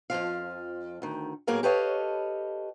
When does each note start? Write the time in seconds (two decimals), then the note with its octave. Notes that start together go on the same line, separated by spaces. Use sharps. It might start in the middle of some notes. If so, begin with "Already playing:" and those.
0.10 F2 A#2 F3 F5
1.02 D2 D#3
1.47 A2 F#3 A#3 G#4 A#4 F5
1.63 G4 A4 B4 C#5 D#5 F5